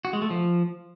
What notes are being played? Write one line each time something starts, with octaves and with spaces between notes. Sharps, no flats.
F#4
G#3
A3
F3